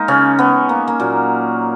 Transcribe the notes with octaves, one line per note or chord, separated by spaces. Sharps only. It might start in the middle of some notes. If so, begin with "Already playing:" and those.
Already playing: G#3 A#3 D#4 A#4
C#3 C#4
B3
A#3
A#3
A#2 F#3